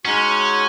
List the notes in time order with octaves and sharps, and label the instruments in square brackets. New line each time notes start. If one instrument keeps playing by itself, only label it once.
[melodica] G#3 D#4 F#4 [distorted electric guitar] C#4